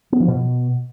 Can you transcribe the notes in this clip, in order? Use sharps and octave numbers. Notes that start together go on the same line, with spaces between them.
B3
F3
B2